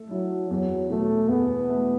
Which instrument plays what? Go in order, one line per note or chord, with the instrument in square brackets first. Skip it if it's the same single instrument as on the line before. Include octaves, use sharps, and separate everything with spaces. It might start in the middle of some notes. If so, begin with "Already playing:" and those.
Already playing: [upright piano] A3 A4
[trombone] F#3 [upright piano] E4
[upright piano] E2 [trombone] F#3
[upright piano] B2 [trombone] A3
[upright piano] E2 [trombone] B3
[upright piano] A3